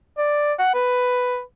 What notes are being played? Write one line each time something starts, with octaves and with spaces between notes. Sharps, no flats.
D5
F#5
B4